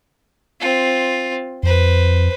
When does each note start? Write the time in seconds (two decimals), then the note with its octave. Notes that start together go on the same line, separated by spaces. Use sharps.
0.61 C4 F4
1.63 F2 B4 C5